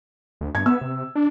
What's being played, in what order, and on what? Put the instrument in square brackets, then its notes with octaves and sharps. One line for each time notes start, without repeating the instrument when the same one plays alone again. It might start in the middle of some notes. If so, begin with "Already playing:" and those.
[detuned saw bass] D2
[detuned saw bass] G2 [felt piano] G#6
[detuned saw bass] B3 [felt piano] E6
[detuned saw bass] C3
D4